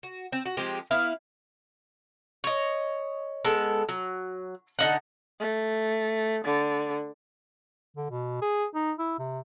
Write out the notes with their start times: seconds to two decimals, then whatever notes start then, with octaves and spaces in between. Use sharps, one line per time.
0.03 F#4
0.32 C4
0.45 F#4
0.57 F3 G#3 C4 G4
0.91 B3 E4 F5
2.44 C#5 D#5
3.45 G#3 B3 A4
3.89 F#3
4.79 D3 D#4 F#5
5.40 A3
6.45 D3
7.97 D3
8.11 B2
8.42 G#4
8.75 D#4
8.99 E4
9.19 C3